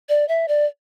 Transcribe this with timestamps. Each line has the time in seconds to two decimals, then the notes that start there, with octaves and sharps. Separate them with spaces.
0.09 D5
0.28 E5
0.48 D5